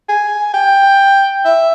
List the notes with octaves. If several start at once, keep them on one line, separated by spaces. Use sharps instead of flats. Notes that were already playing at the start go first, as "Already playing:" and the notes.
G#5
G5
E5